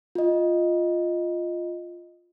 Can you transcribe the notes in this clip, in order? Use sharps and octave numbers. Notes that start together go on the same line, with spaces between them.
F4 D#5